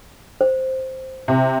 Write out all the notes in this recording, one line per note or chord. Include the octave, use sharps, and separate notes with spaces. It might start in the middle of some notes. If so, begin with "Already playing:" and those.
C5
C3